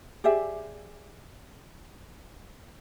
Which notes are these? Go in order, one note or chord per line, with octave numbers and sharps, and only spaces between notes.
G4 G#4 D5 E5